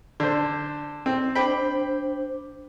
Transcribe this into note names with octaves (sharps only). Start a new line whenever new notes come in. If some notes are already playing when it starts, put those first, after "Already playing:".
D3 C5
C4
D4 C5 G5 B5